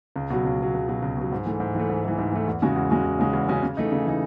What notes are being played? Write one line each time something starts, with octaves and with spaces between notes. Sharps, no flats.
C#2
B2 F#3
C#2
B2 F#3
C#2
B2 F#3
C#2
B2 F#3
G#2
E3 A3
G#2
E3 A3
G#2
E3 A3
G#2
E3 A3
E2
C#3 G#3 C#4 F#4
E2
C#3 G#3 C#4 F#4
E2
C#3 G#3 C#4 F#4
E2
C#3 G#3 C#4 F#4
C#3
E3 A3 D#4
C#3
E3 A3 D#4